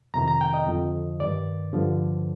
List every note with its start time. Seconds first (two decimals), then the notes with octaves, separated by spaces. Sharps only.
0.14 F2 C3 D#3 A#5
0.28 A#5
0.41 G5
0.54 D#5
0.66 F2 D3 F3
1.19 G2 D#3 D5
1.73 G2 D3 F3